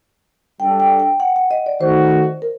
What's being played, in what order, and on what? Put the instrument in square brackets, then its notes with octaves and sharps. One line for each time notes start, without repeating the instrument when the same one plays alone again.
[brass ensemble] G3 D4 A4 [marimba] G5
[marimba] G5
G5
F#5
F#5
D#5
D5
[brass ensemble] D#3 A3 D#4 F#4 [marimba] C5
[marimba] A#4